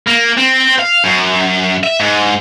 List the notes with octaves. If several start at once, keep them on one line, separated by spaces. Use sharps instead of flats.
A#3
C4
F5
F#2
E5
G#2